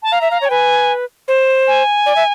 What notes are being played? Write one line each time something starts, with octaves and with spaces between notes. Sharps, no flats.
A5
F5 A#5
E5
F5
C#5
G5
B4 G#5
C5
G#5
D5
E5